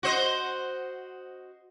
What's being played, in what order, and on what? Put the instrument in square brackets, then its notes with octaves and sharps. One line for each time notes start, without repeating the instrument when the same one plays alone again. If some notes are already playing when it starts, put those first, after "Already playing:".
[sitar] F#4 C5 D#5